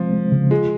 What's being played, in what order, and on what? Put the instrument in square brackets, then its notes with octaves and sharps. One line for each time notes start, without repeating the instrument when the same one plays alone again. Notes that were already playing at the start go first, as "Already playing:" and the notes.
Already playing: [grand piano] F3 [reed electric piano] G#3 C4 C5
[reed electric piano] G#3
C#3
[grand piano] G#3 [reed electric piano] F4